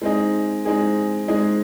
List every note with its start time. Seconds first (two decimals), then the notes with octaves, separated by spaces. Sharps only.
0.02 G#3 C4 D#4 G#4
0.65 G#3 C4 D#4 G#4
1.28 G#3 C4 D#4 G#4